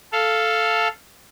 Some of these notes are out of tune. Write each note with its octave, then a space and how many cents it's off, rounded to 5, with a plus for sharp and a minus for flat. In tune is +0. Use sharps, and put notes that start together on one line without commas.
A4 +0 F5 -5